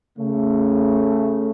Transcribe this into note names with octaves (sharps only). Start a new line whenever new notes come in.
C#3 A3